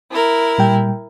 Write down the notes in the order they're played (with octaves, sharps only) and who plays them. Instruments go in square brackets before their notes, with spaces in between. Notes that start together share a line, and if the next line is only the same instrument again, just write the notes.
[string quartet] E4 A#4
[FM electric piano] A#2 G3 G5